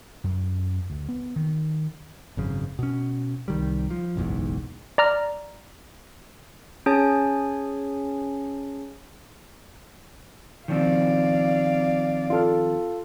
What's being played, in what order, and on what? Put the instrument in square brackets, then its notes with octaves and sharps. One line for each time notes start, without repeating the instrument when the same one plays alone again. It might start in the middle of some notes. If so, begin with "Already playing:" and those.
[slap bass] F#2
D2
B3
D#3
[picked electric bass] G#1 F#2 C#3
B2 C#4
C2 D#3 G3
F3
F#1 B1 E2 G#2
[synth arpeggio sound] D5 A#5 F6
[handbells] C#4 G#4 C#5 G#5 A5
[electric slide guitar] D#3 F3 C4 [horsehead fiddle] D5 F5
[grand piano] F4 A4 F6